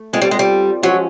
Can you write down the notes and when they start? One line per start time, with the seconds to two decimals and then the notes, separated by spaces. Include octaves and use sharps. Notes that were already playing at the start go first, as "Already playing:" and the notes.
Already playing: A3
0.13 G#3 C4 F4 A4 D5
0.21 G3
0.31 G#3
0.39 G3
0.83 F3 F#3 G#3 C#4